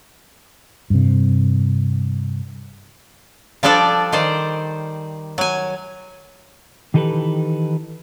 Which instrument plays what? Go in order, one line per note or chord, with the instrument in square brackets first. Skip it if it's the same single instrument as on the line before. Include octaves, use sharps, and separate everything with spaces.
[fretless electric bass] G2 C3
[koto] F3 G3 D4 A4 D5
D#3 C5 D5
F#3 G#5
[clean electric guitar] D#3 E3 D#4 G4 A4 B4